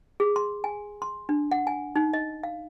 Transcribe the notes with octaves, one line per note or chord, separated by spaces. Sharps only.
G#4
C6
G#5
C6
D4
F#5
G#5
D#4
D#5
F5